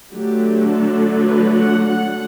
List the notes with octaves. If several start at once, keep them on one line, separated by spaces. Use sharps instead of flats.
D3 F#3 A3 D4 G4
A4
B4
F#5
F#5